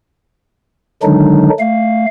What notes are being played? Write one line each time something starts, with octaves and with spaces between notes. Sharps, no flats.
D3 D#3 F#3 G#3 D4 D#4
A3 F5